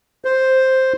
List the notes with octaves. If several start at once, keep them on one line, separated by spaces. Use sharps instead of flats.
C5